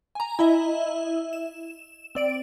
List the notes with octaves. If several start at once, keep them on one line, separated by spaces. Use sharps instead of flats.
G#5 A#5
E4 D#5 E5
E7
C4 D5 D7